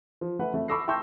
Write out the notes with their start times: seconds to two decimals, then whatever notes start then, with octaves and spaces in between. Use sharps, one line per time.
0.21 F3
0.39 A3 B4 F#5
0.54 F2 A3
0.68 B5 C#6 D6 E6 A#6 C7
0.88 G5 A5 C6 C#6 E6 G6